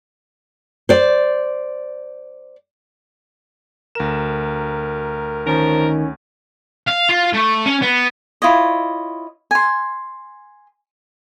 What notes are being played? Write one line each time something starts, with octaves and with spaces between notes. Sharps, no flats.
C5 D5
D2 A#4 E7
D#3 F3 C#4 A#4
F5
F4
A3
C#4
B3
E4 F4 C#5 D#5
G#5 C6